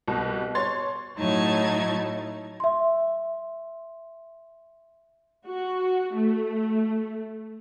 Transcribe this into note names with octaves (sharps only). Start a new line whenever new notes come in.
C2 B2
C#5 C6 A6
A2 F#3 D#4 E4 A5 G#6
E5 C6
F#4
A3